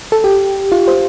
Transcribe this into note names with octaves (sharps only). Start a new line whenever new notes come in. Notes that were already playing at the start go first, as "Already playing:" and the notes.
A4
G4
F4
C5